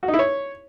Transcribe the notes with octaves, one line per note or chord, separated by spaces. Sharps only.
F#4
D#4
E4
C#5